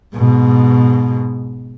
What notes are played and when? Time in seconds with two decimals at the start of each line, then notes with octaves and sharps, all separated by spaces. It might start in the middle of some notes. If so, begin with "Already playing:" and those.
0.16 G#2 B2